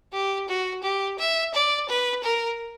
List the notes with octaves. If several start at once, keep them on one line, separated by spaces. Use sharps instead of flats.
G4
F#4
G4
E5
D5
B4
A#4